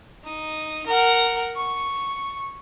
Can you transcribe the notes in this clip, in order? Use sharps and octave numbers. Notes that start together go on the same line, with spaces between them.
D#4
A#4 F#5
C#6